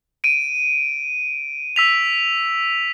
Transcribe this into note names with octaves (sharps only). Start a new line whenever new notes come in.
D7 D#7
E6 B6 F7